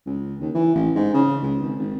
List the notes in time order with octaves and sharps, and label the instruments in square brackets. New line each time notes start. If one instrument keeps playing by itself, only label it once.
[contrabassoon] C#2
D#2
E3
A1
G#2
C#3
C#2
G#1
G#1